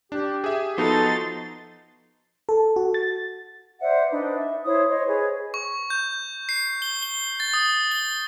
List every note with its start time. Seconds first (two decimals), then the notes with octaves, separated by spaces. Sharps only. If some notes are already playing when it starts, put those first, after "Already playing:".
0.12 D4 G4
0.44 G#4 E5
0.78 F3 B3 D#4 F#4 A4 C6 A6
2.49 A4
2.76 F#4
2.94 A6
3.81 C5 D5 E5 F#5
4.11 D4 D#4 B4
4.36 E5
4.64 E4 C5 C#5 D#6
4.89 C5 C#5 D#5
5.08 G#4 B4 C#5
5.54 C#6
5.90 G6
6.49 C7
6.82 G7
7.03 G7
7.40 A6
7.54 D#6
7.91 G7